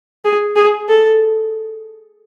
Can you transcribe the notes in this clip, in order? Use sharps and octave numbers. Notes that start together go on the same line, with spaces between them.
G#4
G#4
A4